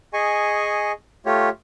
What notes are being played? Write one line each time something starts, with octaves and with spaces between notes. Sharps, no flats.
G#4 D#5 G#5 C#6
A3 F4 G4 C#5